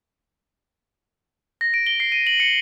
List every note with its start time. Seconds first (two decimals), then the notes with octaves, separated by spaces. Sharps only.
1.61 A#6
1.74 D7
1.87 G7
2.00 C7
2.12 D#7
2.27 F#7
2.40 C#7